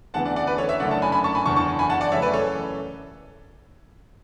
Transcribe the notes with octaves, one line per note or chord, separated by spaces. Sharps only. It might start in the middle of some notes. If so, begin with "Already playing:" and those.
D2 C#3 E3 B3 F#5 A5
D5 F#5
D5 F#5
B4 D5
A4 C#5
C#5 E5
F#1 F#2 D3 A3 D4 D5 F#5
F#5 A5
G#5 B5
G#5 B5
A5 C#6
G#5 B5
F#1 E2 D3 A5 C#6
A5 C#6
G#5 B5
F#5 A5
D5 F#5
F#2 C#3 E3 A3 C#5 E5
B4 D5
A4 C#5